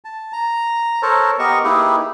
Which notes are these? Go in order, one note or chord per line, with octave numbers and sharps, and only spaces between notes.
A5
A#5
A4 A#4 C5 C#5 A5
B3 G4 A#4 D#5 C#6
A#3 D#4 E4 G4 G#4 B4